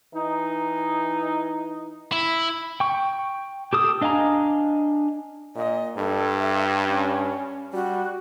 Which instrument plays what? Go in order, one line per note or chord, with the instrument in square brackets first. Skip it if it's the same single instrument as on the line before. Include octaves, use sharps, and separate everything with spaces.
[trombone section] E3 D#4
[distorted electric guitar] E4
[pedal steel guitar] G5 C#6
G4 A4 D#6 E6
D4 D#5 F5 G#5 A#5
[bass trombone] A#2 [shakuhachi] D#5
[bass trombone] G2 [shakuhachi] A4
[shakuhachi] E5
C#4
[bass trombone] G3 [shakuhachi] F#4